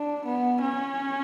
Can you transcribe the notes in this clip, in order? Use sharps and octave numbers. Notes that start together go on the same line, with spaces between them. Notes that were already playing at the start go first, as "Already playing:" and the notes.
Already playing: D4
B3
C#4